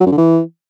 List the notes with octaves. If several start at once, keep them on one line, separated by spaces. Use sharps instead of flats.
F#3
F#2
D3
E3